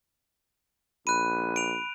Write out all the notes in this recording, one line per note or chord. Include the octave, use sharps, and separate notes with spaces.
A#1 B5 F#6 D#7
D7 F7